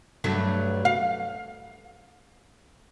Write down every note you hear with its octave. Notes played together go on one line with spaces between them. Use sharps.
G2 F#3 A3
F5